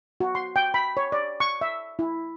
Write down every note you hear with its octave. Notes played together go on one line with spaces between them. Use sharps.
F#4
C6
G5
B5
C#5
D5
C#6
E5
E4